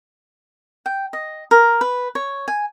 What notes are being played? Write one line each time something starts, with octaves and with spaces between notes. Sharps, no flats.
G5
D#5
A#4
B4
C#5
G#5